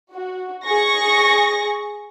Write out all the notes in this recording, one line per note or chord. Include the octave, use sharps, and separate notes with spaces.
F#4
G#4 C#6 A#6